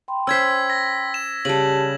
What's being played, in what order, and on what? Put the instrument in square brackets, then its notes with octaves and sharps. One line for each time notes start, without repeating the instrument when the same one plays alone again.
[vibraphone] G5 B5 C6
[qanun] C#4 C5 [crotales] E6 G#6 B6
[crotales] A#6
E7
[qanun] C#3 G3 [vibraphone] G4 A5 [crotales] F#7